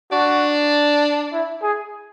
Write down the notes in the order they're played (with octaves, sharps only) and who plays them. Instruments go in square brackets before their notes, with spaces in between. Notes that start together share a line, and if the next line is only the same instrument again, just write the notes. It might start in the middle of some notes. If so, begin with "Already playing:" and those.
[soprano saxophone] D4 [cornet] F#4
[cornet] E4
G#4